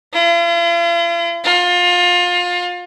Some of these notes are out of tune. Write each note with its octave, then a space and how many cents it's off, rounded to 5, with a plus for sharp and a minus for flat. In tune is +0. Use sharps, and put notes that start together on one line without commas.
F4 -45
F4 +25